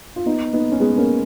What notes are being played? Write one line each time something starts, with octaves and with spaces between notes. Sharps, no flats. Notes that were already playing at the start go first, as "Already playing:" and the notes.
F4
B3 D#4
B3 D#4
C#4
G#3 B3
A#3 C#4